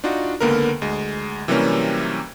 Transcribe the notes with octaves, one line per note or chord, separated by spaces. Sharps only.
D4 D#4 F4 F#4
C#2 D3 A#3 B3 A#4
D2 G#3
C3 E3 F#3 G3 A#3 C#4